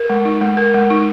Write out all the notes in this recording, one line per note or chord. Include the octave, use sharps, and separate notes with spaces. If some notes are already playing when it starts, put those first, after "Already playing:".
Already playing: A#4
G#3
D#4
G#3
A#4
G#3
D#4